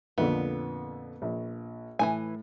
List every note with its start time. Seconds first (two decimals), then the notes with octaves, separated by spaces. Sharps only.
0.18 F2 A#2 D3 B3
1.22 A#1
1.99 A2 E3 D#4 G#5